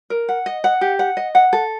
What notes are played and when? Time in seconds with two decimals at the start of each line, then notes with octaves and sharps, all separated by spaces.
0.10 A#4
0.29 F#5
0.46 D#5
0.64 F#5
0.81 G4
0.99 F#5
1.17 D#5
1.35 F#5
1.53 A4